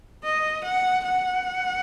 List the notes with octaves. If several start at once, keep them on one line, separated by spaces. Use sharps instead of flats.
D#5
F#5
F#5